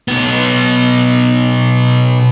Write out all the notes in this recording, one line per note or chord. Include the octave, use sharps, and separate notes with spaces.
B1 B3